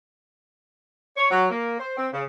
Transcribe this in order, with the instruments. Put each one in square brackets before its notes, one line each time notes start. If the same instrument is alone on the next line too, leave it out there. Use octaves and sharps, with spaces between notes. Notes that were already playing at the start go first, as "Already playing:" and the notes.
[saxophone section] C#5
F#3
A#3
C5
C4
C#3